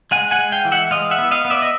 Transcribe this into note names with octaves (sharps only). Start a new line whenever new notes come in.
G#3 F#5 G#5
F#5 G#5
G#3
F5 G5
E3
E5 F#5
G#3 D#5 F5
E5 F#5
B3
D#5 F5
B3
D5 E5
D#5